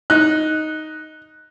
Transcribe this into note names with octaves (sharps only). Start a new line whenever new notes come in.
D#4 F#6